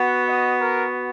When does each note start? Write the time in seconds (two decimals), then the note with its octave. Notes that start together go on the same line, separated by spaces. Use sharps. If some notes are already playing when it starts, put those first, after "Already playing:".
Already playing: B3 F#4
0.26 D#5
0.59 A#4